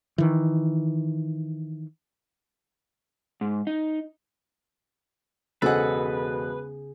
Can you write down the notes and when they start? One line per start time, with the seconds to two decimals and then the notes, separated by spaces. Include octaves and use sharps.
0.18 D#3 E3
3.41 G#2
3.67 D#4
5.62 E1 C#3 G#4 A4 B4 C5 D#5 F#5